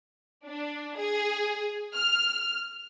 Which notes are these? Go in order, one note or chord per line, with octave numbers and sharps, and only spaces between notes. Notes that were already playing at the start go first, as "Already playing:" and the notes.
D4
G#4
F6